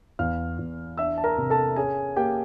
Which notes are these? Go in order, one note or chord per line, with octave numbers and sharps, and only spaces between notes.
E2 F5 F6
E2
D4 E5 E6
A5
A#4 A#5
C3
A4 A5
C#4 G#4 G#5
A#3 G4 G5